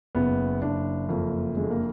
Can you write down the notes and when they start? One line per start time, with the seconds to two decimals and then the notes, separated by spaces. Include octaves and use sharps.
0.15 F#1 B3
0.62 F#1 D4
1.09 F2 A#3
1.56 D3 G#3
1.70 A#3